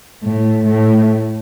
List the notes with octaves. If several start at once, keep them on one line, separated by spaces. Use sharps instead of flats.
A2
A2